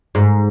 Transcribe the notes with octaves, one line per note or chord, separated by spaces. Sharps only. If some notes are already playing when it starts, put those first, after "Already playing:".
G#2